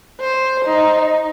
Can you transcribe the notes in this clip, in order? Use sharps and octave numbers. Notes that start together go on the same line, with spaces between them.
C5
D#4